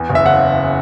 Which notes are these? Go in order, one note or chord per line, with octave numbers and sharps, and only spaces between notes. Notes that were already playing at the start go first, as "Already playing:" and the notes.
Already playing: E2
F#1
E5
C#3 F#5